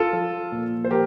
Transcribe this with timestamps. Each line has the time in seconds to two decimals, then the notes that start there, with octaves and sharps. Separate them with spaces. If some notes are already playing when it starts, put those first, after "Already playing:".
Already playing: F4 A4
0.13 F3
0.52 A#2
0.84 C5
0.90 F3 G4 A#4